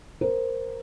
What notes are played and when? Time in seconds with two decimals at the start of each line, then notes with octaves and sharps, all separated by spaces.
0.21 A#4 C5